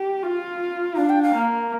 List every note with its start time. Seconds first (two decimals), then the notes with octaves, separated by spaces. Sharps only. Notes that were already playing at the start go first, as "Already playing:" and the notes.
Already playing: G4
0.22 F4
0.96 D4 F5
1.10 G5
1.23 F5
1.34 A#3